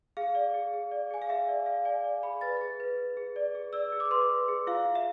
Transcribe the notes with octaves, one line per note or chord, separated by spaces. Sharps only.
G#4 F5
D5
G#4
G#4
D5
G#4 G#5
F5
G#4 E5
D5
D5 F5
D5 G#5
D5
G#4 B5
B4 A6
G#4 A6
B4
B4
G#4
D5
G#4
D5 E6
G#4
D6
B4 C6
B4
G#4
F4 F5
F4
E5